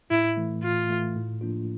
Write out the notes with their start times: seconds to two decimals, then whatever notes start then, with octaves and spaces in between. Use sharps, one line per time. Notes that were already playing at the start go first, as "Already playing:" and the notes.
0.11 A2 E4
0.37 E3 A3
0.63 A2 F4
0.90 E3 A3
1.16 A2
1.41 F3 A#3 D4 F4